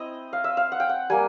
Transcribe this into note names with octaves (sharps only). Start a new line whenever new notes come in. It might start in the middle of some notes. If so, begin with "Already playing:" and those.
Already playing: C4 E4 D#5
F5
E5
F5
F#5
G5
F#5
G3 A#3 G#5